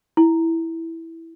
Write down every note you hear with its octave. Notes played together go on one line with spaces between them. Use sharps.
E4